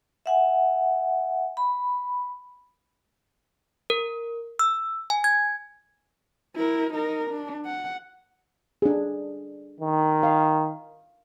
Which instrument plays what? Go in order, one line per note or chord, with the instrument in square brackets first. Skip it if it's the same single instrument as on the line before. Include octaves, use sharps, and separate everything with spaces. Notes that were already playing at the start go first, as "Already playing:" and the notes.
[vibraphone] E5 F#5 G#5
B5
[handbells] A#4
E6
G#5
G#6
[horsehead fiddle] E4 A#4
D#4 A#4
D4
F#5
[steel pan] D4 G#4
[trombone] D#3
[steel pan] F5